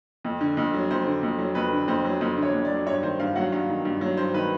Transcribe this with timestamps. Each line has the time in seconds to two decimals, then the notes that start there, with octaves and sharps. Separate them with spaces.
0.24 F2
0.41 D3
0.57 F2
0.74 F#3
0.91 F2 C5
1.06 D3
1.23 F2
1.39 F#3
1.55 F2 B4
1.73 D3
1.88 F2 C5
2.05 F#3
2.21 F2 C5
2.37 D3
2.43 C#5
2.53 F2
2.65 D5
2.70 F#3
2.87 G2 C#5
3.03 D#3 C5
3.19 G2 F5
3.35 F#3 F#5
3.52 G2 F5
3.69 D#3
3.85 G2
4.01 F#3
4.17 G2 C5
4.34 D#3 B4